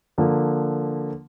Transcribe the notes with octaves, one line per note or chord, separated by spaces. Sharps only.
D3 F3 A#3